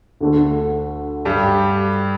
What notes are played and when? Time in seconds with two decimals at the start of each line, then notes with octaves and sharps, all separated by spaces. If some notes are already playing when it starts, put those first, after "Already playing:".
0.20 D2 D3 A3
1.25 G2 G3